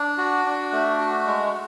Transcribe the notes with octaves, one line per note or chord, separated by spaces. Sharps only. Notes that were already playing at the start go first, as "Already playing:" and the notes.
Already playing: D4
F#4
D4
A3
F#4
G#3